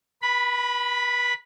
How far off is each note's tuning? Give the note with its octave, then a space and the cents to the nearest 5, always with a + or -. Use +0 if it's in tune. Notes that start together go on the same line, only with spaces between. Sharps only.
B4 -30 B5 +0